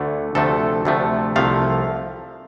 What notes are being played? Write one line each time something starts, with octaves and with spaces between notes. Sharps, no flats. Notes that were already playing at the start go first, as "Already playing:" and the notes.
Already playing: D2 D3 A3
D2 C3 F3 A3 A4
D2 C3 F3 A3
C2 C3 F3 A3 F5